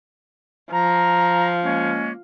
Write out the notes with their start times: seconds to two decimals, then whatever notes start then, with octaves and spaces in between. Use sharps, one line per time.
0.73 F3 A#5
1.63 G#3 A#3 C#4